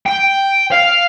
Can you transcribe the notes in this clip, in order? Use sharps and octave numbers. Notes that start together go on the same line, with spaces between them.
G5
F5